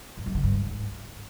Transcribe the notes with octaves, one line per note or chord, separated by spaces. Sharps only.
G2
F#2
D3
G2
G#2